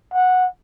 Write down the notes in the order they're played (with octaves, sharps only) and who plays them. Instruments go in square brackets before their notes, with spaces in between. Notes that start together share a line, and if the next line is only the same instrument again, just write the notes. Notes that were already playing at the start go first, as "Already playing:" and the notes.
[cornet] F#5